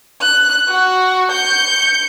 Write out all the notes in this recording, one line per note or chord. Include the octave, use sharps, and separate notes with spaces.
F#6
F#4
G6 C#7